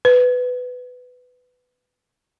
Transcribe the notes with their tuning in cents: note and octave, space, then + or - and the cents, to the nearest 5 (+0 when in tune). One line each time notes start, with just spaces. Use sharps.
B4 +15